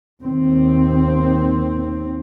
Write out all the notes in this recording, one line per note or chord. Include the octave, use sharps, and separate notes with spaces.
D#2 C4